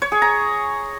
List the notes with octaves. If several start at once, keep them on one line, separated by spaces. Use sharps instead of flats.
C#5
G#4
A#5